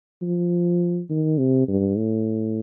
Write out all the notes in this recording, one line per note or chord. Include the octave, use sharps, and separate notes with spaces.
F3
D#3
C3
G2
A2